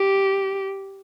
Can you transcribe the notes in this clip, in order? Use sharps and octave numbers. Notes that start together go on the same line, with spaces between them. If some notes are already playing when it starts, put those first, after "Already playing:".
Already playing: G4